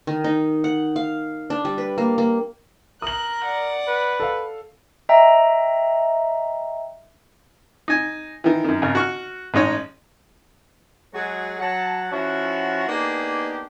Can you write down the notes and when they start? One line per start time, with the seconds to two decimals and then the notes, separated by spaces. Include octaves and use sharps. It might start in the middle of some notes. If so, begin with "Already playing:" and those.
0.07 D#3
0.24 D#4
0.64 F#5
0.96 F5
1.50 D4
1.65 G3
1.78 B4
1.98 A#3
2.18 A#3
3.02 A#4 D#6 F#6 F#7
3.44 D5 F#5
3.87 B4
4.20 A4 F5
5.09 D#5 E5 G5 A#5
7.88 D#4 G#5
8.44 D#3 E3
8.64 F#2 D#3
8.82 G#1 C#3 A#4
8.95 F#4 C#6 F6
9.54 A1 G#3 D#4 C#5
11.14 F#3 G#3 F#4 G#4
11.60 F#3 F#5 A5
12.12 F3 C#4 E4 F#4
12.89 A#3 B3 D4 D#4 G4 G#4